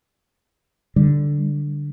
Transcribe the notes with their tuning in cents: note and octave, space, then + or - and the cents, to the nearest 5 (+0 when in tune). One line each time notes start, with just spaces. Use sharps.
D3 +0 G3 -5